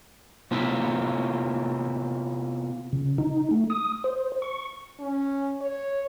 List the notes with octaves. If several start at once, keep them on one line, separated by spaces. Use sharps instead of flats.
C3 B3 E4 F4
C#3
D#4
A3
D#6
C5
C#6
C#4
C#5